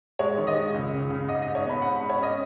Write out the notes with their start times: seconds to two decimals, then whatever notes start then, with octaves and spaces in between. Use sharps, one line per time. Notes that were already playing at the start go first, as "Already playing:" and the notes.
0.19 G#3 C#5
0.38 D#3
0.47 D#5
0.56 G#3
0.74 C#2
0.93 C#3
1.10 C#3
1.28 G#2 D#5
1.42 D#5
1.47 G#2
1.55 C#5
1.64 B3
1.70 B5
1.82 G#2 F#5
1.96 B5
2.01 G#2
2.10 C#5
2.18 C#4 D#5